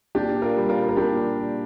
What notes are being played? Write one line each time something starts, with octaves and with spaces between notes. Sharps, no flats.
A#2 D4 G4
F4 A#4
G3
F4 A#4
A#4
A#2 D4 G4